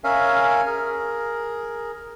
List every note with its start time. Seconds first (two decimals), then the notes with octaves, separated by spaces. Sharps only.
0.04 C#4 A#4 C#5 E5 F5 G#5
0.66 G#4 A#4